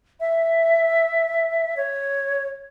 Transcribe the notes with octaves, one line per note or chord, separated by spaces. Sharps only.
E5
C#5